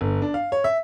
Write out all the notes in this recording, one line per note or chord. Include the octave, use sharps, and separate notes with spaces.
G1
D4
F5
C#5
E5